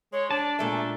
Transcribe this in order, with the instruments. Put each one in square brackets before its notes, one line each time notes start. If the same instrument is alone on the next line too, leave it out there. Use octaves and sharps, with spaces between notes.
[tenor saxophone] G#3 [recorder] C#5
[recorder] D4 [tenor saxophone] D5 [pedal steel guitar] A5
[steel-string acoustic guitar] A#2 G#3 E5 [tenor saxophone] A3